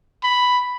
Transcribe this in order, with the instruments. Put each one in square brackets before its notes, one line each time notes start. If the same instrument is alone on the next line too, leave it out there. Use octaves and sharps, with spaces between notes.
[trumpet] B5